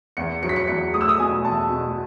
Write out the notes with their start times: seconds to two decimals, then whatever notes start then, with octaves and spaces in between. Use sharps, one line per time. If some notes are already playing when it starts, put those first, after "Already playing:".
0.17 E2 C#7
0.43 F#3 C#7
0.49 B6
0.56 C#7
0.68 E2 C#7
0.93 A3 D#6
1.01 E6
1.09 D#6
1.19 B2 G#5
1.44 E2 A5
1.70 B2